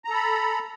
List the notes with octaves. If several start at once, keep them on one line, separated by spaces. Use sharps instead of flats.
A4 A#5 B5